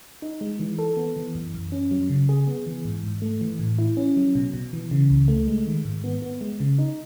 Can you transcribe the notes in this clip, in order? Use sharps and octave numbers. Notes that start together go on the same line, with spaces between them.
D#4
G#3
E3
A4
B3
E3
F#2
F#2
C#4
F#3
C#3
G#4
B3
E3
G#2
G#2
A3
E3
A2
E4
C#4
F#3
B2
B2
E3
C#3
C#2
A3
G#3
D#3
G#2
B3
B3
G#3
C#3
D#4